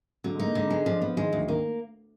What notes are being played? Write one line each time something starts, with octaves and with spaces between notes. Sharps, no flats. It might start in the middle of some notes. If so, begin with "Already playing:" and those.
D3 F#3
G#3
D#4
A#3
D3 G#3
B3
G#3 D4
F3 D4
F3 B3
D#3 G#3
D2 D#3
D#3 A#3